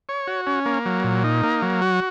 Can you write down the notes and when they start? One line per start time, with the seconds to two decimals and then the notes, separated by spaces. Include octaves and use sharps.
0.09 C#5
0.27 F#4
0.47 C#4
0.66 A#3
0.86 F#3
1.04 A#2
1.24 D#4
1.43 A#3
1.62 F#3
1.82 F#4